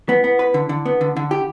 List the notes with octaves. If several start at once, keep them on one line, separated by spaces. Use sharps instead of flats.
B3 E4
B3
B4
D3
D3
B3
D3
D3
E4 G4